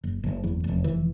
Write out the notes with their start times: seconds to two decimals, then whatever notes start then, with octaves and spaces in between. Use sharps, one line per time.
0.04 F#1
0.23 F#1
0.44 E2
0.64 F1
0.84 E3